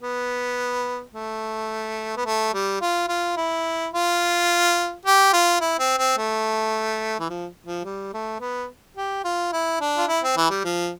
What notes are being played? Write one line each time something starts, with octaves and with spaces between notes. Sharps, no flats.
B3
A3
B3
A3
G3
F4
F4
E4
F4
G4
F4
E4
C4
C4
A3
E3
F3
F3
G3
A3
B3
G4
F4
E4
D4
F4
E4
C4
E3
G3
F3